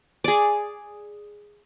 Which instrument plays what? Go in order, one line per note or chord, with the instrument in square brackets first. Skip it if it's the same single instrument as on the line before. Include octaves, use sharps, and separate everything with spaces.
[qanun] G#4 D5